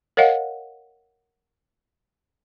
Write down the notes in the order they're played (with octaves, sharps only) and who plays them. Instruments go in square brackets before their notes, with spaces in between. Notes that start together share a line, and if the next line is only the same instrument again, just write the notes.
[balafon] A#4 C#5 D#5 F5 F#5